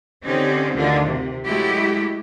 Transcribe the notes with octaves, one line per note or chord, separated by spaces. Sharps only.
D3 C4 C#4 D#4 G4 C5
D2 D3 D#3 F4
C3
F#3 G#3 A3 E4 F#4 G4